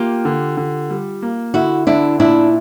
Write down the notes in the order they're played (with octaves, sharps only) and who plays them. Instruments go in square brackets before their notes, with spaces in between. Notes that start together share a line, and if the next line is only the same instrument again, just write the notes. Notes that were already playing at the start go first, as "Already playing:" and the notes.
Already playing: [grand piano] A#3 [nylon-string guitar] F4 G4
[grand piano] D3
D3
G3
A#3
[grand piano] D3 [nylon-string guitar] E4 F#4
[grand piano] D3 [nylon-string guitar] D4 E4
[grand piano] A#2 [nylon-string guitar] D4 E4